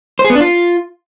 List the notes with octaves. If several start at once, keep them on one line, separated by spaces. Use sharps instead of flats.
C5
G#4
B3
D4
F4